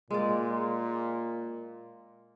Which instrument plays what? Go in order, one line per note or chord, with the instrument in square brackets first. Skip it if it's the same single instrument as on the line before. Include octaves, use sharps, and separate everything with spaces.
[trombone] A#2 [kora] G#3 D5